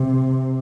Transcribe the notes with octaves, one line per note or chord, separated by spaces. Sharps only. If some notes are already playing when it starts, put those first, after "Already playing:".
Already playing: C3